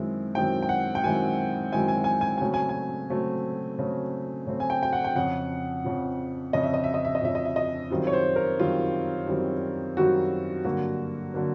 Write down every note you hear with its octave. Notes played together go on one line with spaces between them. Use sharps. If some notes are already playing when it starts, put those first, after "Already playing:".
Already playing: F#2 D#3 G#3 C4 E4
F#2 D#3 G#3 C4 E4 G5
G5
F#5
G5
F#2 D#3 G#3 C4 E4 G#5
F#2 D#3 G#3 C4 E4 G#5
G#5
G#5
G#5
G#5
C#3 F#3 A3 C4
G#5
G#5
C#3 F#3 A3 C4
C#3 F#3 A3 C4
C#3 F#3 A3 C4
G#5
G5
G5
F#5
G5
F2 C#3 F3 F#5
F2 C#3 F3
F2 C#3 F3 D#5
E5
D#5
E5
D#5
E5
D#5
F2 C#3 F3 E5
D#5
E5
D#5
F#2 D#3 G3 C4 F4
C#5
C5
A#4
F#2 D#3 G3 C4 F4
F#2 D#3 G3 C4 F4
F#2 D#3 G3 C4 F4 F#4
G2 D3 F#3 A#3 F#4
D3 F#3 A#3